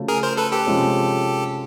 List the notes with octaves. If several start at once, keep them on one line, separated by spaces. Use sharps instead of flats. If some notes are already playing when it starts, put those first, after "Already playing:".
Already playing: C#3 F3 A3 C#4 F#4
G#4 A#4
A#4 C5
A4 B4
G4 A4
C3 F3 G#3 C#4